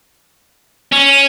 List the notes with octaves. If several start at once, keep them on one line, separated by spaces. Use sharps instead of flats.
C#4